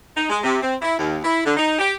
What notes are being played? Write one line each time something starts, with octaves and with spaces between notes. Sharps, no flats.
D#4
G#3
C3
C4
E4
D#2
E4
D3
D#4
G4